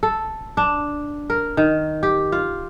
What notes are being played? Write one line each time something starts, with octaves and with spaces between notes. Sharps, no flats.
A4
D4
A#4
D#3
G4
F4